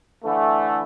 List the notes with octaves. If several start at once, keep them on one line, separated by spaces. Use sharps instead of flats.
D3 E3 A3